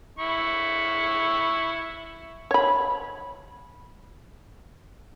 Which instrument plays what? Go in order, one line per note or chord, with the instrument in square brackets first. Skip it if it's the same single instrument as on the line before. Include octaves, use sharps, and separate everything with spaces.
[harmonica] E4 C#6
[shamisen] C#5 B5